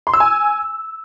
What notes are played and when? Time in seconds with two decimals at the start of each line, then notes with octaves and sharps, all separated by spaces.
0.07 C6
0.14 E6
0.20 G#5